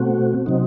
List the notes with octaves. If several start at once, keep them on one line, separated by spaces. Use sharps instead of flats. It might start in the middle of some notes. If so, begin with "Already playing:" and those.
Already playing: B2 A3 C4 F#4
C3 F#3 C4 D#4